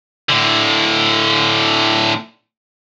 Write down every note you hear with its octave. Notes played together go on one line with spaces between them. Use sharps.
A2 D3